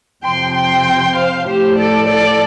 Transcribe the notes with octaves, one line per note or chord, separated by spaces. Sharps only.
F2 C3 F3 G5 C6
G5 C6
C5 F5
A2 F3 G4 C5
A4 D5
A4 D5